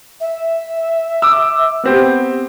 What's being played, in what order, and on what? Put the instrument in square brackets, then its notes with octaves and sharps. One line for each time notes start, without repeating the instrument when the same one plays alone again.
[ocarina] E5
[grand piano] D6 E6
B3 C4 G4